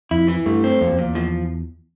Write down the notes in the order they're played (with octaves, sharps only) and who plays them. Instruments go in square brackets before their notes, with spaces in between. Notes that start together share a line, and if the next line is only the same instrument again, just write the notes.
[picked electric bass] F2 [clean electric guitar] E4
[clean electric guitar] E3
[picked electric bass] G2 [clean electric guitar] A3
[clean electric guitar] C4
[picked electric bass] F2 [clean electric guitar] A#2
[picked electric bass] F2
[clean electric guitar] A#2
[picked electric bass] E2
[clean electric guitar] F3